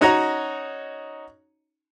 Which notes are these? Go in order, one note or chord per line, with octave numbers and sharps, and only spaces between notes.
C#4 D#4 F#4 C#5 D#5 A#5